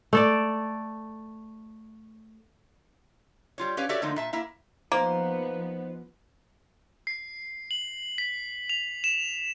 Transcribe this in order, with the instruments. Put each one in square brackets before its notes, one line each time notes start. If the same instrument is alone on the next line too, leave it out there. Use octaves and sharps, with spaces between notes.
[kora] A3 A4 D5
[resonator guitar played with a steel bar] G3 F4 C#5
C#4 G4 B4 C#5 F5
F#4 G4 A4 C#5 D5 E5
D3 F3 A3 A#3 D#4
A#2 E5 A5
A#3 E4 E5
[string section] F3 B3 [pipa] A#3 [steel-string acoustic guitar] D#4 C5
[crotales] C7
F#7
B6
F7
E7